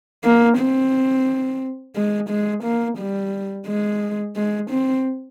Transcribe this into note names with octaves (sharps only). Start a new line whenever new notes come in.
A#3
C4
G#3
G#3
A#3
G3
G#3
G#3
C4